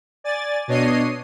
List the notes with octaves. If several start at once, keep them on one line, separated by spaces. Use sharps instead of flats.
D5 G#5 A6
B2 D4 C#5 D#5 C7 D#7